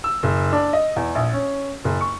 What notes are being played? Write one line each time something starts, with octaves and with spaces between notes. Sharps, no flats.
E6
F#1
D4
D#5
E2
A#1
C#4
F#1
C#6